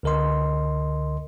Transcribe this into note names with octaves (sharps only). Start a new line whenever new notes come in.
C#2 D3 A#4 D#5 C6